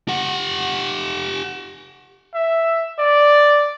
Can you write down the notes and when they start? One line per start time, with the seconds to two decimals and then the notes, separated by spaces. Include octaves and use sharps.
0.08 G4 F#5
2.35 E5
2.99 D5